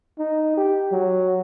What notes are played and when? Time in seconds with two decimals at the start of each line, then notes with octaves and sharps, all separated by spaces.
0.19 D#4
0.57 G4
0.92 F#3